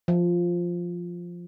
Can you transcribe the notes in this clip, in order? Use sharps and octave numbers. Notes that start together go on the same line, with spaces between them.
F3